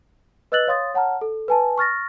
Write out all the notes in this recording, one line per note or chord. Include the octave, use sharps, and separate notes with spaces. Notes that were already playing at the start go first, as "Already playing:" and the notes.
B4 D#5 E6 F#6 A6 F#7
C#5 F5 C6 D#6 A6
C#5 F#5 A5 A#5 F6
A4
B4 G#5 A5
C#6 F6 A6 A#6